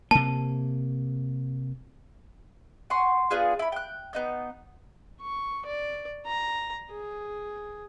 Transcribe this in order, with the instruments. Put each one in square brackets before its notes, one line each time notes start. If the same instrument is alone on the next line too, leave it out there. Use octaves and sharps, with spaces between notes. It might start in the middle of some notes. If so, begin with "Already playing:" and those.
[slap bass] C3 A#3 [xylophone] A5
[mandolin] F#5 G#5 C6 C#6
B3 D4 F4 G#4
E4 B5
G5 F#6
B3 D#4 G6
[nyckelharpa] C#6
D5
A#5
G#4